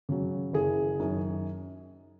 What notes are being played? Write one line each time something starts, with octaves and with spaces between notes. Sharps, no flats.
C#3 F#3
F#1 G#4
F#2 D#3